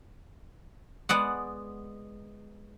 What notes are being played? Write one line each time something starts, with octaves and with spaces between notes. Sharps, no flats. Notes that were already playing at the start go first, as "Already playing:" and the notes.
G#3 B3 D5 F#5